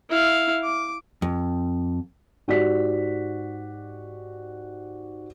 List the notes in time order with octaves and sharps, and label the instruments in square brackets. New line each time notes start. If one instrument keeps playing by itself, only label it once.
[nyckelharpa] E4 F5
D6
[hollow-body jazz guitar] F2
[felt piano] G#2 F#4 G4 D5 B6